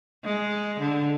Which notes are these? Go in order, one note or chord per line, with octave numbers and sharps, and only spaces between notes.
G#3
D3